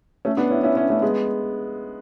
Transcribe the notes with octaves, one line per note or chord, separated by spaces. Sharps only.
A3 C#4
B3 D4
C#4 E4
C#4 E4
C#4 E4
A3 C#4
G#3 B3